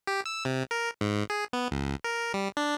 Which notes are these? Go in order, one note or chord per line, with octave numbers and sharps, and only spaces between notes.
G4
E6
C3
A#4
G#2
G#4
B3
C#2
A#4
G3
D4